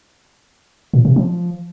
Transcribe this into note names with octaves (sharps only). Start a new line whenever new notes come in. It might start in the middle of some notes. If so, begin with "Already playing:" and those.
A#2
C3
F3